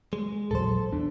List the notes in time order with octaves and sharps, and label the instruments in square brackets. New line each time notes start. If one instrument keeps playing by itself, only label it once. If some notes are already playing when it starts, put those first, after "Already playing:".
[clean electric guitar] G#3
[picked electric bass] A#1 E2 F#3 [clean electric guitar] A4 C5
[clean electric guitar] E2 [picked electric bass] D4